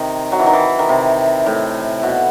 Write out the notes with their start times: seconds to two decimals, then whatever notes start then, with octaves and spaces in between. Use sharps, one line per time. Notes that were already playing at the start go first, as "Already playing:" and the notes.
Already playing: C3 D#3
0.32 F#3
0.39 E3
0.46 D#3
0.53 E3
0.79 D#3
0.89 C3
1.46 A2
2.03 B2